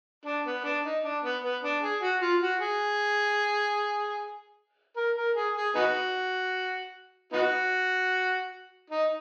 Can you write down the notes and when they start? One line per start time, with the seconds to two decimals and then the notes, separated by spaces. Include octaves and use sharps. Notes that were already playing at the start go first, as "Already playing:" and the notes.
0.25 D4
0.45 B3
0.64 D4
0.85 D#4
1.04 D4
1.24 B3
1.43 B3
1.63 D4
1.82 G#4
2.02 F#4
2.22 F4
2.42 F#4
2.61 G#4
4.97 A#4
5.16 A#4
5.36 G#4
5.56 G#4
5.75 B3 D#4 F#4
7.32 B3 D#4 F#4
8.90 D#4